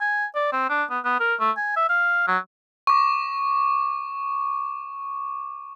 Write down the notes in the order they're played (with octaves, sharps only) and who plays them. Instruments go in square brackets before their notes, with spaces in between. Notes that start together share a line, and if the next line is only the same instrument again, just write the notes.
[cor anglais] G#5
D5
C4
D4
B3
B3
A#4
A3
G#5
E5
F5
F#3
[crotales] C#6 D6